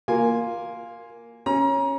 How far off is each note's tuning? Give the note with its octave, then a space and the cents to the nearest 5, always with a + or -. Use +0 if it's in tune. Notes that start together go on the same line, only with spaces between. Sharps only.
A#3 +0 F4 +0 G#5 +0
C#4 -10 A#5 +30